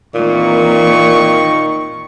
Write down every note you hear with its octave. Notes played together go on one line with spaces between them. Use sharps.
A#2 D#3 E3 A#3 C4 C#6